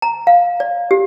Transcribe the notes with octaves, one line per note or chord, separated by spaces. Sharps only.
A#5
F5
D5
G4